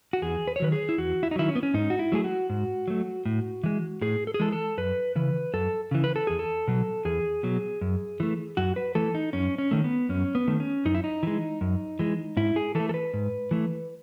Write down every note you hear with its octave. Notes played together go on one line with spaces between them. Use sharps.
F#4
E2 G#4
B4
C#5
D#3 F#3 B4
G#4
E4
E2 F#4
E4
D#4
D#3 F#3 E4
C#4
B3
C#4
G#2 D#4
F#4
E4
F#3 A3 G#4
F#4
G#2
F#3 A3
A2
E3 G#3
A2 G#4
A4
G#4
E3 G#3 A4
A4
F#2 B4
C#3 E3 B4
F#2 A4
C#3 E3
B4
A4
E2 G#4
A4
B2 F#3
E2 G#4
B2 F#3
F#2
E3 A3
F#2 F#4
B4
E3 A3 A4
D#4
F#2 C#4
C#4
D#3 A3
B3
F#2 C#4
B3
D#3 A3
C#4
F#2 D#4
E4
D#4
E3 G#3
F#2
E3 G#3
G#2 E4
G#4
E3 A3 A4
A4
B4
G#2
E3 A3